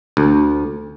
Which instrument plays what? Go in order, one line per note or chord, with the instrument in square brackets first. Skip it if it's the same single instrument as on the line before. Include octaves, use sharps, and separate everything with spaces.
[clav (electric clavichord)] D2